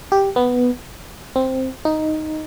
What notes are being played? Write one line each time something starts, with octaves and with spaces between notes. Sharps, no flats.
G4
B3
C4
D#4